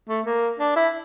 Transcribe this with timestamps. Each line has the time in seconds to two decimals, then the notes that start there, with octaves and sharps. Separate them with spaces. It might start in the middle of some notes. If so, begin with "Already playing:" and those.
0.09 A3
0.26 A#3
0.59 D4
0.76 E4